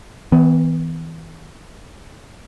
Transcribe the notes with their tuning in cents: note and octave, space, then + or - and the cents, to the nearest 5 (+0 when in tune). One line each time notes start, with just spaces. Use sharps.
E3 -25 B3 +25